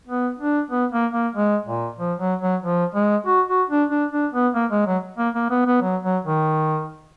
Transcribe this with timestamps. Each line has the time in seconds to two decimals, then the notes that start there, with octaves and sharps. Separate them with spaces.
0.07 B3
0.39 D4
0.70 B3
0.92 A#3
1.13 A#3
1.35 G#3
1.66 A#2
1.98 F3
2.20 F#3
2.41 F#3
2.62 F3
2.94 G#3
3.26 F#4
3.48 F#4
3.69 D4
3.90 D4
4.12 D4
4.33 B3
4.55 A#3
4.71 G#3
4.87 F#3
5.18 A#3
5.34 A#3
5.50 B3
5.66 B3
5.82 F#3
6.03 F#3
6.25 D#3